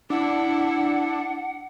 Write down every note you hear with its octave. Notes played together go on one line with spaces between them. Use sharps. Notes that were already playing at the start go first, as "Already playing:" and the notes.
D4 E4 F#5